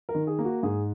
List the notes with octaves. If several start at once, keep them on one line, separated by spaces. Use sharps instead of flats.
A#4
D#3
G#4
A#3
F#4
G#2 G#4